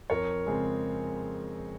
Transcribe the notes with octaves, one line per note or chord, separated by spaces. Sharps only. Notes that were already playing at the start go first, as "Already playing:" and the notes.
F2 A#4 C#5
C#3 G#3 C4